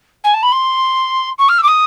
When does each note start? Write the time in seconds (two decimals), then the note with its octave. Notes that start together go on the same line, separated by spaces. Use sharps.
0.23 G#5
0.33 A5
0.42 B5
0.51 C6
1.38 C#6
1.48 F6
1.58 E6
1.62 D6
1.67 D#6